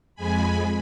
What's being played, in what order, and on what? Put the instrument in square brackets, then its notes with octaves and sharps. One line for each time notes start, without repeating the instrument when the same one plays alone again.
[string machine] F2 G#3 G#5 B5